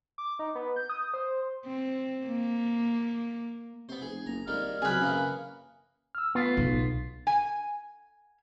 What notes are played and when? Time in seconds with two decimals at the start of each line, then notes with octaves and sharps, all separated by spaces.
0.18 D6
0.39 D#4
0.55 B3
0.76 G6
0.89 D#6
1.14 C5
1.66 C4
2.26 A#3
3.89 C3 B3 C5
4.02 F1 G#4
4.26 F#1 A#5
4.47 G#1 G3 G#3 A#3 F6
4.82 C#2 C3 F#3 C4 G#4 B4
5.00 F#2 C#3 E3 A#3
6.15 E6 F6
6.35 A3 B3 F4
6.57 B1
7.27 G#5